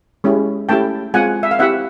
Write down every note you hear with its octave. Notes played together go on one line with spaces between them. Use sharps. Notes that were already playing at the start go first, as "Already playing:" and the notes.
G#3 C#4 E4 G4
A3 C#4 E4 G4 G5 A5
G#3 C4 F4 F#5 G#5
E5
F5
C4 E4 G4 E5 F#5